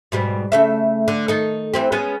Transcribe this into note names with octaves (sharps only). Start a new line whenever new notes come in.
G#2 B2 G3
C#3 A3 E5
D3
D#3 D#4 A4
E3 C4 G4
G#3 B3 C#4